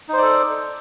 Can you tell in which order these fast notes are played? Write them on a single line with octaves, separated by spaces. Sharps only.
D#4 C5 D5 A4